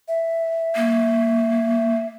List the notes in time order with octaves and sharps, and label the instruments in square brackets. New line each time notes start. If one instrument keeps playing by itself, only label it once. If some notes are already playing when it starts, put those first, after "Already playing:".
[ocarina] E5
[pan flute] A#3